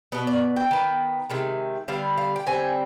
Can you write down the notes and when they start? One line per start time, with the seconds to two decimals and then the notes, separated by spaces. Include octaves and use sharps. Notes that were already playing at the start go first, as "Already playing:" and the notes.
0.12 B2 B3 D#5
0.27 D5
0.56 G5
0.71 D#3 B3
1.30 C3 D#3 G#3
1.88 D3 G3 B3 F5
2.17 F5
2.36 G5
2.47 D3 G3 C4 G#5